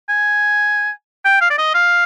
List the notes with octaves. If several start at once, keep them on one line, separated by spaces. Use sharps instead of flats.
G#5
G5
F5
D5
D#5
F5